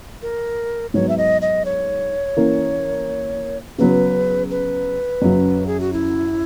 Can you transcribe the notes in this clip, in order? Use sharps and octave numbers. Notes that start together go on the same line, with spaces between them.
A#4
G#2 F#3 B3 C#5
E5
D#5
D#5
C#5
E3 A#3 C#4
C#3 F#3 B3 B4
B4
F#2 C#3 F#3
G#4
F#4
E4